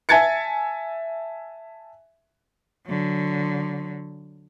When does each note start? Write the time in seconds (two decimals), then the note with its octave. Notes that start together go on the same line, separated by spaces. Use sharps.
0.09 E5 G#5 A5 G#6 A6 C#7
2.87 D3 F#3